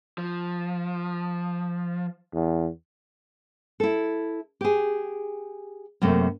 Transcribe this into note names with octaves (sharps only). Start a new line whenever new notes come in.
F3
E2
E4 A4
G4 G#4
F#2 C3 A3 A#3